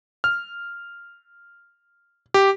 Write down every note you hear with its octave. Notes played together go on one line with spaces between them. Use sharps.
F6
G4